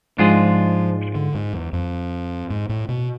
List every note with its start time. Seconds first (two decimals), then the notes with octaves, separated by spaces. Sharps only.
0.18 G#2 F3 G#3 D4 F4 G#4
1.15 D3
1.35 G#2
1.53 E2
1.73 F2
2.50 G#2
2.69 A2
2.89 B2